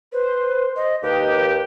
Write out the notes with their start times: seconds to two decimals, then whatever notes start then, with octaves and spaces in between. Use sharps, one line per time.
0.12 B4 C5
0.76 D#5
1.03 D#2 G4 B4 D#5